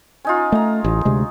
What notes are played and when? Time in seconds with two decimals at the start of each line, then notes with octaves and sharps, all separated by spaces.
0.25 C#4 D#4 F4
0.52 A3 D#4 A#5
0.84 A1
1.05 D2 C3 G#3